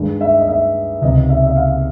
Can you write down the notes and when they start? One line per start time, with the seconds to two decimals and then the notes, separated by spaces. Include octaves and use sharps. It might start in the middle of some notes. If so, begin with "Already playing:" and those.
Already playing: G2 D#3 G#3
0.21 E5
0.39 D#5
0.48 E5
1.02 C#2 C3 D#3 D#5
1.30 E5
1.46 E5
1.56 F5